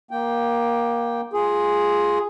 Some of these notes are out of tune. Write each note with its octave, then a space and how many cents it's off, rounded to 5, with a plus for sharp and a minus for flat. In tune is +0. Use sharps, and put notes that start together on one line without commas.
A#3 +15 G5 -5
F4 +0 G#4 +0